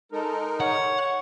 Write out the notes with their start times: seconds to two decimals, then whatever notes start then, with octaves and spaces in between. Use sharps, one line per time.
0.12 G#3 D#4 A4 A#4
0.60 C#5 F#5